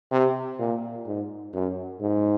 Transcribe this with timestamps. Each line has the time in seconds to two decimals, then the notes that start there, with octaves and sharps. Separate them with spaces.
0.11 C3
0.59 A#2
1.06 G#2
1.53 F#2
2.01 G#2